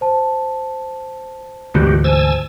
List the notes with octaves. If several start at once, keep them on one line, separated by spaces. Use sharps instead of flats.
C5 A5
D2 G#2 E3 F#4 G4
C5 G#5 A5 E6